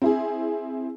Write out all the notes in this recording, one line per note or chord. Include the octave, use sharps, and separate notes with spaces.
C4 E4 G#4